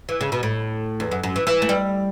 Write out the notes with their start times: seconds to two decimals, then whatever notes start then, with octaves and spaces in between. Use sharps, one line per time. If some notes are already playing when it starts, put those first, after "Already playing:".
0.09 E3
0.21 C#3
0.32 B2
0.43 A2
1.00 E2
1.11 F#2
1.23 F#2
1.36 E3
1.47 E3
1.62 A3
1.69 G3